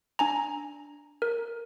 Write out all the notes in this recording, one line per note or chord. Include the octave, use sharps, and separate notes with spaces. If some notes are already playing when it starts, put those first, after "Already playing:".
D4 G#5 A#5
A#4